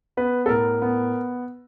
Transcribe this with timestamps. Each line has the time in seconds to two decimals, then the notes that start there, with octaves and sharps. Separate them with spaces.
0.17 B3 B4
0.46 A4
0.49 A2 A#4
0.82 B3